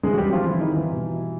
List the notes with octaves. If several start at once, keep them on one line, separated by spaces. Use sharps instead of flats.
C3 E3 G3 G#3 G#4
F#4
G3 G4
F3 F4
E3 E4
D#3 D#4
E3 E4
B2 G3